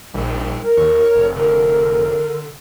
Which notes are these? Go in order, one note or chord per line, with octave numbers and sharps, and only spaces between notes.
A#1 G3 D#4
A#4
D#2 C#5
F1
D3 A#4